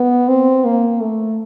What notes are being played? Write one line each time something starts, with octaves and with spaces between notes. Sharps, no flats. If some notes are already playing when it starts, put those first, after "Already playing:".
Already playing: B3
C4
A#3
A3